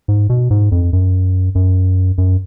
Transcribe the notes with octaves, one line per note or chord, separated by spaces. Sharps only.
G#2
B2
G#2
F2
F#2
F#2
F#2